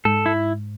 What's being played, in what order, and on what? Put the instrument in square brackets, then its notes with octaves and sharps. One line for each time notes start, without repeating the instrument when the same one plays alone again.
[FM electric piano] G#2 [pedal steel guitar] A4
[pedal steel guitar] E4